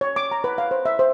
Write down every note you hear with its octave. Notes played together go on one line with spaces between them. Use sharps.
C#5
D6
A#5
B4
F5
C5
E5
C5